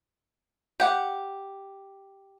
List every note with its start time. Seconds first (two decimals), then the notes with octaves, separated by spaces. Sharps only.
0.80 G4 F#5